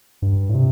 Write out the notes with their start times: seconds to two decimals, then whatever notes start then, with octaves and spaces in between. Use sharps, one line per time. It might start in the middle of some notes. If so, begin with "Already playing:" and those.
0.22 G2
0.49 A2
0.54 C3